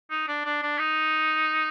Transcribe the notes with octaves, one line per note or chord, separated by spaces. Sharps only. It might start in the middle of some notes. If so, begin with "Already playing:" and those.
D#4
D4
D4
D4
D#4